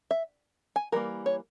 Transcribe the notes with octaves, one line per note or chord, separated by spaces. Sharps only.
E5
G#5
E3 G3 A#3 A#4
C#5